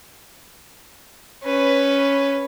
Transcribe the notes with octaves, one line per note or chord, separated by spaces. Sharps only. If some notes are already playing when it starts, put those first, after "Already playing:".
C#4 B4